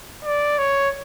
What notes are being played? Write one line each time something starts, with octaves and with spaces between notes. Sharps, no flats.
D5
C#5